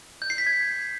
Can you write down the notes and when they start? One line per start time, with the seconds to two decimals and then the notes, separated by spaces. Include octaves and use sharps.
0.22 G6
0.30 C7
0.38 B6
0.47 G#6